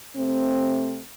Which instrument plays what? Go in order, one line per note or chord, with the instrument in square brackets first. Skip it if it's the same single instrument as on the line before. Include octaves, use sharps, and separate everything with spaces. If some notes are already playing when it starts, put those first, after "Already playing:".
[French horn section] C3 A3 C4